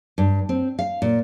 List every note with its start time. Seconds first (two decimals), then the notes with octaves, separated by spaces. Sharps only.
0.18 G2
0.49 C4
0.79 F5
1.02 A#2